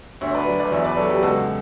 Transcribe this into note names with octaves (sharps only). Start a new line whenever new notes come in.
D2 C#5 E5
B4 D5
F#3
B4 D5
E2 C#5 E5
B4 D5
F#3 A4 C#5
G4 B4
C#2 F#4 A4